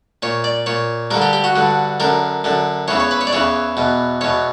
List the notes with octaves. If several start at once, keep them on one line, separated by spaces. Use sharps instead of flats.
A#2 C#5
D5
A#2 C#5
G2 D3 A#4
G4
G4
F#4
G2 D3
F#2 D3 A#4
F#2 D3
E2 C#3 E3 C#5
C#5
B4
C#5
D5
E2 C#3 E3 C#5
E2 B2
E2 B2 C#5